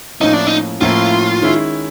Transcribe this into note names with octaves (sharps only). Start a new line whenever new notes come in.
A2 F3 A#3 C#4 D#4 E4
D4
D#4
A2 F3 A#3 C#4 E4 F4
D#3 G#3 C#4 E4